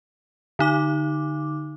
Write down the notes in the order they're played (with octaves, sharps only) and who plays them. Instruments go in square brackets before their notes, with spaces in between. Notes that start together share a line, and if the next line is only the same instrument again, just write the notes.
[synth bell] D3 D#4 D6